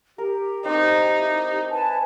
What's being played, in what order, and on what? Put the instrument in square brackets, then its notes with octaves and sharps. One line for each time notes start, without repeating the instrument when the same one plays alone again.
[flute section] G4 [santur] A#4
[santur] C4 C5 [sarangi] D#4
[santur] E4
[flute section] B4 G#5 A5